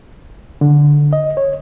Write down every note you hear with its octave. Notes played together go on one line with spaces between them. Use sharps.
D3
D#5
C#5